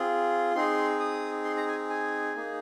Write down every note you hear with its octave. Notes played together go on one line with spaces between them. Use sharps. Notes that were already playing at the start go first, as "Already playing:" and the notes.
Already playing: C4 F4 G#4
C4 D#4 G#4 C6
D#6
C6
A#5
G#5
G#5
A#3 D#4 G#4